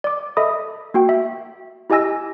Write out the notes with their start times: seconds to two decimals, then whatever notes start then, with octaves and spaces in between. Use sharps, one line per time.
0.04 D5 D6
0.37 A4 D#5 E5 B5 D#6
0.94 A#3 F#4 G5
1.09 E5
1.90 E4 G4 D#5 G#5 E6 A#6